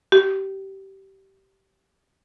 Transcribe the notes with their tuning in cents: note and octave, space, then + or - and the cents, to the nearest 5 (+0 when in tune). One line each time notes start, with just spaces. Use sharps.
G4 -20